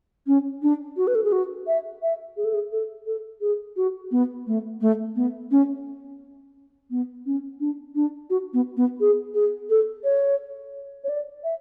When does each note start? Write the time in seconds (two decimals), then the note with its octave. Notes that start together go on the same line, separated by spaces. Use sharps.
0.27 C#4
0.62 D4
0.97 F#4
1.07 B4
1.15 A4
1.24 G#4
1.32 F#4
1.67 E5
2.02 E5
2.37 G#4
2.44 A4
2.54 G#4
2.72 A4
3.06 A4
3.41 G#4
3.76 F#4
4.11 B3
4.47 A3
4.81 A3
5.16 B3
5.51 C#4
6.90 B3
7.26 C#4
7.60 D4
7.95 D4
8.30 F#4
8.53 B3
8.77 B3
9.00 G#4
9.34 G#4
9.70 A4
10.04 C#5
11.04 C#5
11.09 D5
11.44 E5